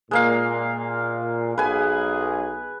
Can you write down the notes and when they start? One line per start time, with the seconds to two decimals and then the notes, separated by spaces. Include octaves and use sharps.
0.11 A#2 G#3 A#3 F5
1.58 B1 G#4 B4 G#5